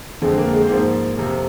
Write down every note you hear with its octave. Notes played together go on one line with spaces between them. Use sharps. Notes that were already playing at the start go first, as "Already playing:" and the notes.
F2 D3 F3 G#3
A#3
G#3
C4
G#2 F3 A#3
F2 C3 F3